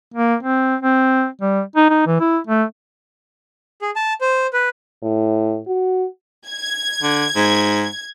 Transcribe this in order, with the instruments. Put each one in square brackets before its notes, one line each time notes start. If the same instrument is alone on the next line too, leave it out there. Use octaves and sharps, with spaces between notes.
[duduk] A#3
C4
C4
G3
D#4
D#4
E3
E4
A3
[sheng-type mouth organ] G#4
A5
C5
B4
[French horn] A2
F#4
[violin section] G#6
[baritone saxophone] D3
G#2